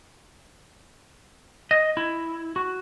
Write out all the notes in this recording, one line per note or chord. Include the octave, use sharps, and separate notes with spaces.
D#5
E4
F#4